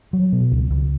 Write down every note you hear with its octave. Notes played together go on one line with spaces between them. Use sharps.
F#3
B2
C#2
C#2